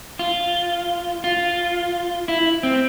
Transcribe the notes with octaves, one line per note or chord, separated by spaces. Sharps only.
F4
F4
E4
C4